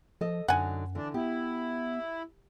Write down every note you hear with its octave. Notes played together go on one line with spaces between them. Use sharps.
F3 A4 D#5
F#2 D3 F#3 D#4 F#5 G#5
D3 E3 D4
B3 E4 G4